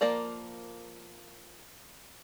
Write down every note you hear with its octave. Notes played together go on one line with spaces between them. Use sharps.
F3 A#3 A#4 D5 A#5